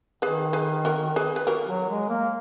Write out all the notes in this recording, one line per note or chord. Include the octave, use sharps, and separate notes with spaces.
D#3 G#4 B4
G#4 B4
F#4 A#4
G#4 B4
B4
F#4 A#4
F#3
G#3
A#3